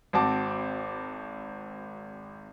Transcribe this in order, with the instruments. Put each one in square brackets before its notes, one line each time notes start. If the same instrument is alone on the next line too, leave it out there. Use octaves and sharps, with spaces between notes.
[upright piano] G#1 C4 F#4 A5 D6